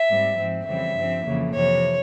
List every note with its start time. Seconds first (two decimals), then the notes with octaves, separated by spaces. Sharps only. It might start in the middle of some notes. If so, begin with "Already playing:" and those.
Already playing: E5
0.08 G#2 G3 C4
0.37 G#2 F3 C4
0.66 F2 C#3 E3 G3 C4 E5
0.95 G2 F3 C4
1.25 F2 C#3 E3 A#3
1.53 F2 C3 E3 C#5